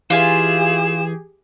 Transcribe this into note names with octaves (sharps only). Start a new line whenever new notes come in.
E3 F4 G4 G#4 E5 G#5 E7